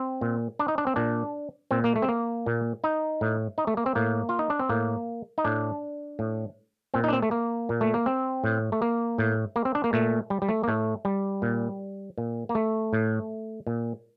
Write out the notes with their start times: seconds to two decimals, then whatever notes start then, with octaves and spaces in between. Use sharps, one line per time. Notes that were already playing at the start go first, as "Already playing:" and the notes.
Already playing: C4
0.21 A#2
0.59 D4
0.68 D#4
0.78 D4
0.87 C4
0.96 A#2 D4
1.71 A#2 C4
1.84 A#3
1.96 A3
2.02 C4
2.08 A#3
2.46 A#2
2.84 D#4
3.21 A2
3.58 D#4
3.67 A3
3.77 A#3
3.86 C4
3.95 A2 A#3
4.29 F4
4.39 D#4
4.50 D4
4.59 C4
4.69 A2 A#3
5.38 D#4
5.45 A2 D4
6.19 A2
6.94 A#2 C4
7.04 D#4
7.08 D4
7.13 C4
7.22 A3
7.31 A#3
7.69 A#2
7.81 A3
7.94 A#3
8.06 C4
8.44 A2
8.72 A3
8.82 A#3
9.18 A2
9.56 A#3
9.65 C4
9.75 D4
9.84 A#3
9.93 A#2 A3
10.30 G3
10.42 G3
10.49 A3
10.63 A#3
10.68 A2 A3
11.05 G3
11.42 A#2
12.18 A#2
12.49 A#3
12.55 A3
12.93 A2
13.67 A#2